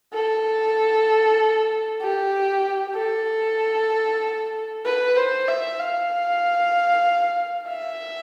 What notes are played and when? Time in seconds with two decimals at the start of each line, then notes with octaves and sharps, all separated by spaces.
0.14 A4
2.02 G4
2.96 A4
4.85 B4
5.16 C5
5.48 E5
5.79 F5
7.68 E5